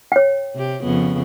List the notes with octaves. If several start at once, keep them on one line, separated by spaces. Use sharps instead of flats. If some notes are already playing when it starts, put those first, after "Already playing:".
C#5 G5
C3 G4
F2 C#3 B3